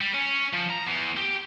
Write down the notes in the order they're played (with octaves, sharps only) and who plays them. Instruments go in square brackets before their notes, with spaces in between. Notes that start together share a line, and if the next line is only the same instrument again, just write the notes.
[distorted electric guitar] G3
C#4
F3
A#5
E2
G4